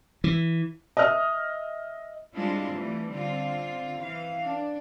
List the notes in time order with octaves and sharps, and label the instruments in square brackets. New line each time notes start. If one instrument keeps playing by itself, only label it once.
[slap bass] E3
[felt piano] D#5 E5 D#6 F6
[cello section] G3 G#3 C4 D4 E4 F4
E3 G3 A3
D3 C4 F4
E3 F5
D4